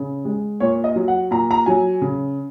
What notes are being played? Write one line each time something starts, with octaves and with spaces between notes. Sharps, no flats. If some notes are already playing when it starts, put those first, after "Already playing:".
Already playing: C#3
G#3
A#2 C#5
D#5
F#3
F#5
A#2 A#5
A#5
F#3 G#5
C#3